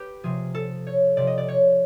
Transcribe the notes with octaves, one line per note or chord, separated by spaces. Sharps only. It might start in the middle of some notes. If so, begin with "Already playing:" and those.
Already playing: G4 B4
C3 F3 G#4
A4
C#5
C3 F3 D5
D#5
D5
C#5